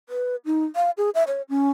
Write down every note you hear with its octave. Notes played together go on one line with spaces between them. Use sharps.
B4
D#4
F5
G#4
E5
C#5
C#4